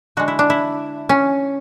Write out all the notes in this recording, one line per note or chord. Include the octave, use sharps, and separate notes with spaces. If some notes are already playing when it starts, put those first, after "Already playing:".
D3 G#3 F#4
E4
D4
E4
C#4